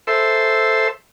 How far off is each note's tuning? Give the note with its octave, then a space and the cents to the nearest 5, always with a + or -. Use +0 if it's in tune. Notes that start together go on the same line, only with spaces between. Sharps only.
A4 +0 C5 +0 E5 +0